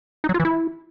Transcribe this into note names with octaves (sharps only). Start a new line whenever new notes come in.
D#4
F#3
F4
E3
E4